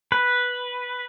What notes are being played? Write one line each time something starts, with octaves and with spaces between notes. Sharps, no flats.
B4